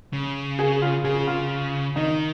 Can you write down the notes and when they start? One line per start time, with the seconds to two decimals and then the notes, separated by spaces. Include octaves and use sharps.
0.13 C#3
0.59 G#4
0.82 F4
1.04 C#3 G#4
1.27 F4
1.96 D#3 D#4